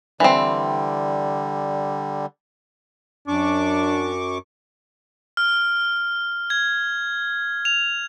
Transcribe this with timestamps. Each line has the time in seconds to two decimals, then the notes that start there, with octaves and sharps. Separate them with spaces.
0.20 D3 E3 G3 C4
3.28 F#2 D4 C#6 D6
5.37 F6
6.50 G#6
7.65 F7